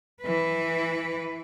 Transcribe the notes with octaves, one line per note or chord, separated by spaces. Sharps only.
E3 B4